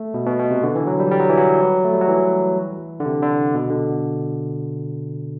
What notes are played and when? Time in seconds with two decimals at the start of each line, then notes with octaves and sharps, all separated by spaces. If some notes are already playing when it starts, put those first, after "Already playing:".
Already playing: A3
0.14 B2
0.26 B2
0.39 B2
0.51 C3
0.63 D3
0.75 E3
0.87 F#3
1.00 G3
1.11 G3
1.20 F#3
1.29 E3
1.37 F#3
1.85 A3
1.93 G3
2.01 F#3
2.08 E3
3.00 D3
3.06 C3
3.23 D3
3.55 B2
3.70 D3